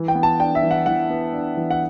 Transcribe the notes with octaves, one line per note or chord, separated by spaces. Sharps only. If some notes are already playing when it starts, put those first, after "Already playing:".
Already playing: E3
G5
B3
A5
D4 G5
E5
E3
F#5
E3 F#5
B3
D4
E3
F#5